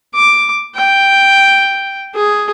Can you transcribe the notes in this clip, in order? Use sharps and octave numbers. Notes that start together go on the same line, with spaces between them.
D6
G5
G#4